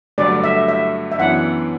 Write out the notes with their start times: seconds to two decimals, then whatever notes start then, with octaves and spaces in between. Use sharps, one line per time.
0.18 G2 D3 F#3 A3 D5
0.44 E5
0.68 E5
1.12 E5
1.19 F#2 E3 B3 D4 F#5